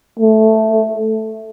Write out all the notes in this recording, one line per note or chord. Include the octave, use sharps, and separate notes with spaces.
A3